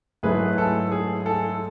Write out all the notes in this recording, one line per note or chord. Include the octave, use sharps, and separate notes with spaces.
G#2 F#3 A3 E4 G#4 B4
A4
G#4
A4